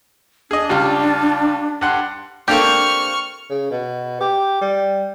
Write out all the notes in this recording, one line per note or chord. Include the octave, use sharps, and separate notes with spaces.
D4 G#4 D#5
C#2 G3 F4
G2 F#5 C6
A#3 C4 D4 G4 A4 C#6 F6
C#3
B2
G4
G3